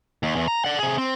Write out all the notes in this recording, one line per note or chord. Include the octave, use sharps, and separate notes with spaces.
D#2
E2
A#5
D5 F#5
C3 G#4
C4